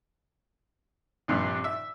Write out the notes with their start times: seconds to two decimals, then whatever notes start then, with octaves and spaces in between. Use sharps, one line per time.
1.28 A#1 G2 C3
1.64 E5